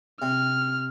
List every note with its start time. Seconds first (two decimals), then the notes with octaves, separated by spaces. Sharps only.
0.22 C3 F6